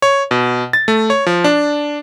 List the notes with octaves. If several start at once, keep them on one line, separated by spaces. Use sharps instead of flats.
C#5
B2
A6
A3
C#5
F3
D4